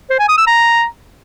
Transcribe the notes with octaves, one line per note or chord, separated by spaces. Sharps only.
C5
G#5
D#6
E6
A#5